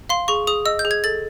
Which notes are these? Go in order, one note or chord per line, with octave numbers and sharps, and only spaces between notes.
F5 C6
G#4 C#6
G#4 D#6
D#5 E6
G6
G#4
G#6
A4 A6